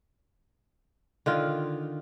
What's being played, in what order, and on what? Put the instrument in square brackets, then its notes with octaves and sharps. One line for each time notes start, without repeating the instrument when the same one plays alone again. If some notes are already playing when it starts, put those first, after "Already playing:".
[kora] D3 D#3 F4